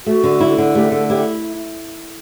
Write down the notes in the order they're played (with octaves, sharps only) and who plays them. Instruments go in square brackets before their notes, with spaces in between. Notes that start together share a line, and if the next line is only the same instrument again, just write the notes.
[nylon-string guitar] A3 [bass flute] F#4
[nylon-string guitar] D3
E4
D3
[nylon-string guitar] A3 [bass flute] G4
[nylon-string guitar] D3 [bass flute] A4
[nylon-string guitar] E4 [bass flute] G4